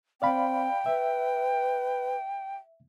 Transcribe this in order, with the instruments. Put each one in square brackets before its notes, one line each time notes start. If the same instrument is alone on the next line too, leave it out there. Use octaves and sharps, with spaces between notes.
[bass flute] C4 [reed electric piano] D5 F5 B5 [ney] G5
[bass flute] B4 [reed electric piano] E5